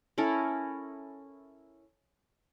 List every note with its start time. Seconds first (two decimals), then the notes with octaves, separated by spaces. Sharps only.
0.18 C#4 E4 A4 A#4